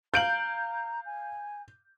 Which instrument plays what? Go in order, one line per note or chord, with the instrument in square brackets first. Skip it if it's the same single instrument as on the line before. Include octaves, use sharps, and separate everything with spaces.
[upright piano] F5 D7 F#7 [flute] A#5 [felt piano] G6
[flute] G#5